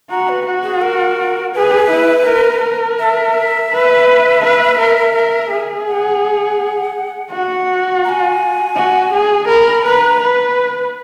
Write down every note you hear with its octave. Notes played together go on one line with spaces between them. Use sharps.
F#4 A#5
B4
F#4
G#4
A#4
G#4 B4
E4
A#4
A#4
E5
B4
B4
A#4
A#4
G#4
F#5
F#4
A#5
G#5
F#4
G#4
A#4 B5
B4 A#5
B4